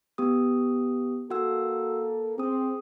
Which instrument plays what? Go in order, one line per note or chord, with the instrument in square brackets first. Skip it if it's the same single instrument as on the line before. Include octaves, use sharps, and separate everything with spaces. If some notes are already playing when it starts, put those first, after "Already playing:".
[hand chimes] B3 G4 D#6
[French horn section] A#3 A4 [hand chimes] F#4 F#5 E6
[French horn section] C4 [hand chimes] G#4 D#6